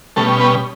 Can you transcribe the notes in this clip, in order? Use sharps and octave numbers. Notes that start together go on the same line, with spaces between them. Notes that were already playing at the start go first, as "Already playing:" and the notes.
B2 G3 A3 C#4 A4
B3 B4